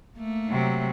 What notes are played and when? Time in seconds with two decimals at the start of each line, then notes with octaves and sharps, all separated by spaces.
0.17 A3 A#3
0.50 C3 F#3